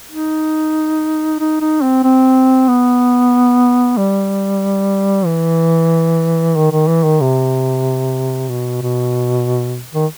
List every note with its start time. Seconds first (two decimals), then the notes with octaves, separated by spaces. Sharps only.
0.11 D#4
1.39 D#4
1.61 D#4
1.82 C4
2.03 C4
2.68 B3
3.97 G3
5.26 E3
6.56 D#3
6.72 D#3
6.87 E3
7.04 D#3
7.21 C3
8.49 B2
8.82 B2
9.94 D#3